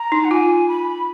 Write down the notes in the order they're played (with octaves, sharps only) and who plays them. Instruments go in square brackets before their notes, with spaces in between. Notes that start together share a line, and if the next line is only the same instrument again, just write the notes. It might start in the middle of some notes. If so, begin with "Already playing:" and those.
Already playing: [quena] A#5
[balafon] D#4
[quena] F#5
[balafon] F4 [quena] G#5
[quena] B5